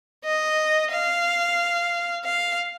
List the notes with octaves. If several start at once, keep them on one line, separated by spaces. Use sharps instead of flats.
D#5
F5
F5